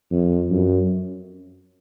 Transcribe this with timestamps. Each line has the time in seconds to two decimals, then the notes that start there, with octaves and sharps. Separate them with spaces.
0.11 F2
0.50 F#2